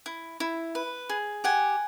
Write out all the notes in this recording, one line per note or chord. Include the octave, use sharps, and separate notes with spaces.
E4
E4
B4
G#4
G4 F#5 G#5